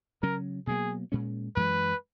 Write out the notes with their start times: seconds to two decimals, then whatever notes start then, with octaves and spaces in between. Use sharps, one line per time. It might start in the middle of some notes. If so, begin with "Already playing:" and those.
0.22 C#3 F#3 C#4 A#4
0.67 B2 F#3 A#3 G#4
1.12 A#2 G#3 C#4
1.56 F#2 E3 G#3 B4